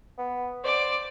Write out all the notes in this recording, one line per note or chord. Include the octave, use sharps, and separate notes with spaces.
B3
C5 D5 D6